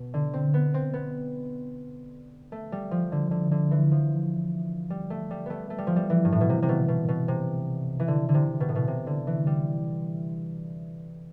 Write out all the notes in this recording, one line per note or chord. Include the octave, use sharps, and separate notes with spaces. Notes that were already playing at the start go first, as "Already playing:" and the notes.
Already playing: B2
D3
C4
B3
C4
B3
A3
G3
F3
D3
D3
D3
E3
F3
G3
A3
G3
A3 B3
A3
G3
F3
G3
E3
G2
A2
B2
C3
C3
B2
B2
B2
C3
E3
D3
D3
C3
B2
A2
B2
C3
D3
E3
G3